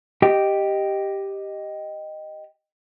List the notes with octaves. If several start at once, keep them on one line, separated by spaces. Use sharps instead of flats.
G4 D#5 G5